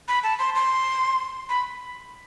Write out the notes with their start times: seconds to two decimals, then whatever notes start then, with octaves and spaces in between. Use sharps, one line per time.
0.08 B5
0.23 A5
0.39 C6
0.55 C6
1.49 B5